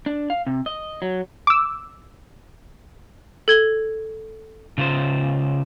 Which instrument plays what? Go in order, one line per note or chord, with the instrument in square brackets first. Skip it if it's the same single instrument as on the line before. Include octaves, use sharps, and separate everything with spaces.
[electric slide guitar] D4
F5
C3
D#5
F#3
[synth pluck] D6 E6
[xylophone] A4 G#6 G7
[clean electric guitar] C#3 F4 C5